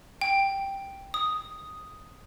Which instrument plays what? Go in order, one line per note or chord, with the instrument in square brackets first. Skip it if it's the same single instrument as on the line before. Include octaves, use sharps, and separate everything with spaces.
[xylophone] G5
D#6